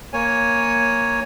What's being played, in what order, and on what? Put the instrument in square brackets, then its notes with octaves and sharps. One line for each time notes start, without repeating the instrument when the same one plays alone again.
[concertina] A#3 C#5 G#5